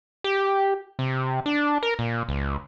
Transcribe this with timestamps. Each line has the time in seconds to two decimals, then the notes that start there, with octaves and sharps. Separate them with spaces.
0.24 G4
0.99 C3
1.46 D4
1.83 A#4
1.99 A#2
2.29 C#2